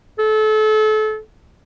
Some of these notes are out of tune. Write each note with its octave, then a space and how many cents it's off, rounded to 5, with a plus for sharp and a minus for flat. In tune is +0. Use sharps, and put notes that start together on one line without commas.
A4 -30